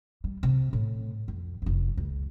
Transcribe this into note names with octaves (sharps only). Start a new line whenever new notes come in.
G3
C3
A2
F2
F1 F#2
C#2